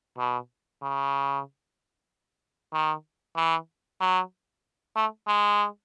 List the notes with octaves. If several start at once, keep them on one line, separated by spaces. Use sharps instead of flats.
B2
C#3
D#3
E3
F#3
A3
G#3